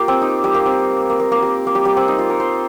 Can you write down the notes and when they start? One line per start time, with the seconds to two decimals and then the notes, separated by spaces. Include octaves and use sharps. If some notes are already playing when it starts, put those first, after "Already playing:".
Already playing: A#3 F4 G4
0.08 C4
0.22 D#4
0.44 G3
0.54 A#3
0.66 C4
1.10 A#3
1.20 A#3
1.32 A#3
1.42 G3
1.67 A#3
1.75 G3
1.85 G3
1.97 C4
2.08 D#4
2.19 F4
2.30 A#4
2.40 C5